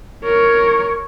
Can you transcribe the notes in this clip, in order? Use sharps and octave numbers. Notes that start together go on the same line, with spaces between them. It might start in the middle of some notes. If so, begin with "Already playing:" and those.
A#4 C#5